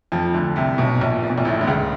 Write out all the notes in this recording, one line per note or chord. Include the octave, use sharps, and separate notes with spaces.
F2 F3
D2 D3
C2 C3
B1 B2
A#1 A#2
A#2
B2
A#1 A#2
A1 A2
D3
C#2 C#3